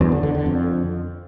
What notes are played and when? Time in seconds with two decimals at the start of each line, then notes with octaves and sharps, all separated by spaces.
0.01 E2
0.12 D3
0.23 D3
0.34 D3
0.46 F2